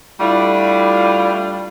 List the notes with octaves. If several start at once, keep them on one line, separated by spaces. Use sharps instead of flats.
G3 A3 D4 E4 F4